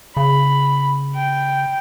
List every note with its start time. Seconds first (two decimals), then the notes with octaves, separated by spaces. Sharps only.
0.17 C#3 B5
1.16 G5